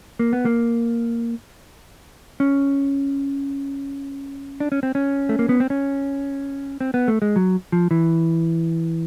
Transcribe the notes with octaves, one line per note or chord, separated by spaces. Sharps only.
A#3
B3
A#3
C#4
D4
C#4
C4
C#4
A3
A#3
B3
C4
C#4
C4
B3
A3
G#3
F#3
F3
E3